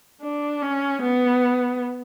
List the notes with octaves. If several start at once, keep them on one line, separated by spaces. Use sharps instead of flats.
D4
C#4
B3